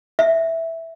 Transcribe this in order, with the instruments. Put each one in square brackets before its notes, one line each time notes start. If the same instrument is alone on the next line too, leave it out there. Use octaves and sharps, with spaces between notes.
[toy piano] E5